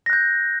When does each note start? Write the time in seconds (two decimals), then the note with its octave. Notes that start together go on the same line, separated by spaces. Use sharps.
0.06 A#6
0.10 F#6
0.13 G6